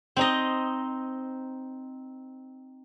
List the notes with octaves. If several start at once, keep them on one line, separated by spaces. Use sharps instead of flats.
C4 D#4 D#5